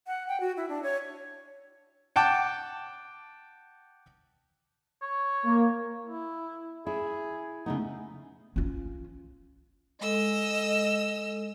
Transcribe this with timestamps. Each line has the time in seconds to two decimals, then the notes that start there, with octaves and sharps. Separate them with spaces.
0.07 F#5
0.28 G5
0.40 F#4
0.57 E4
0.69 D4
0.83 C#5
2.16 F#5 G5 A5 D6
5.02 C#5
5.45 A#3
6.06 E4
6.87 E4 G#4
7.66 C#3 A3 B3 D#4
8.56 C#4 F4
10.01 G#3 A4 D#5 E6